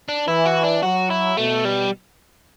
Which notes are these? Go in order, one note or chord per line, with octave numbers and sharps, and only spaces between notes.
D4
E3 E4
F#4
D4
F#3 F#4
E4
B2 A3
G3